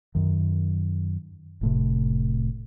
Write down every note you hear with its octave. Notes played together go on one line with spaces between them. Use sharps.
F#2 D#3
F1 A2 C3